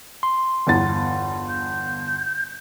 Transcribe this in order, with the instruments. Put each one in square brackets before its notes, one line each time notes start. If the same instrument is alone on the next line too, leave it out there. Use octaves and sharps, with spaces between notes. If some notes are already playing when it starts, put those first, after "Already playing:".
[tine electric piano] C6
[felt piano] G1 E2 A6
[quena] G6